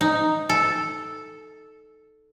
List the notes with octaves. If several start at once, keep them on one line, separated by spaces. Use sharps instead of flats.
D#4
A4